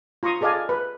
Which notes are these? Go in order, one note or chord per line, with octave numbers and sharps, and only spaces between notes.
F4 A#5 C6 C#6 D#6
G#4 A4 D5 D#5 F5 G#5
B4